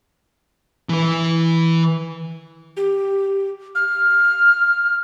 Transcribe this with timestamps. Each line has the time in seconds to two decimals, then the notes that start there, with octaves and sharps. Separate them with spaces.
0.89 E3 B4
2.77 G4
3.75 F6